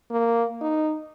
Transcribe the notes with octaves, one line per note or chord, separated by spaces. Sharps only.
A#3
D#4